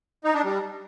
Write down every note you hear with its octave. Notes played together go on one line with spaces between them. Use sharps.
D#4
D4
G3